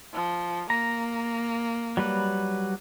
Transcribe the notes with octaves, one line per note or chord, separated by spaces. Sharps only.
F3
A#3 A#5
F#3 G3 B4